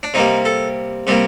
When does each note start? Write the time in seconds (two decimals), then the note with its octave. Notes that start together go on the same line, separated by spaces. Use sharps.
0.03 D4
0.14 C3 G3 A#3 D#4
0.45 A4
1.07 C3 G3 A#3